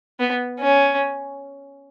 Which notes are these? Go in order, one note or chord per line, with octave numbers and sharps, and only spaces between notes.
B3
C#4